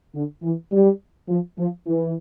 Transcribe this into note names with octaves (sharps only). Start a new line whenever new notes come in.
D3
E3
G3
F3
F3
E3